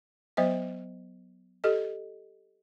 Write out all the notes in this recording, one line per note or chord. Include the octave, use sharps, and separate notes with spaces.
F#3 B3 C5 D#5 E5
G4 A4 D#5